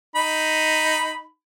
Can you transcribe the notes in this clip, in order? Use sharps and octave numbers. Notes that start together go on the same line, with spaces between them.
D#4 B5